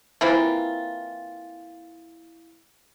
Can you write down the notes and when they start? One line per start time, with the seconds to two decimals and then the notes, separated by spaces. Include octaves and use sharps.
0.21 E3 A#3 C4 F4